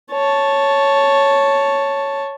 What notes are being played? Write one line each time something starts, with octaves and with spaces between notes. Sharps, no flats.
C#5 A5